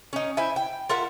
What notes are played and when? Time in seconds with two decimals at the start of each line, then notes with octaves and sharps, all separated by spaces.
0.13 C#4 D#4
0.37 E4 C5 E5 G#5
0.56 G5
0.89 F4 A#4 E5 F#5